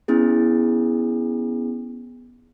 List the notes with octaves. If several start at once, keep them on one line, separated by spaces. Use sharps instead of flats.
B3 C#4 E4 G#4